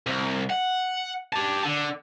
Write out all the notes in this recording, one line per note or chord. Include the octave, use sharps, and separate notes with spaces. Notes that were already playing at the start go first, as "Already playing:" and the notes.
C2
F#5
G4 A5
D3